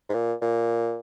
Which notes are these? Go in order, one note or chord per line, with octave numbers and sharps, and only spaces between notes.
G#2
A#2
A#2